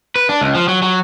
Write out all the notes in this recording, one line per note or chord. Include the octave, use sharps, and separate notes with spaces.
B4
D4
C#2
F3
F#3
F#3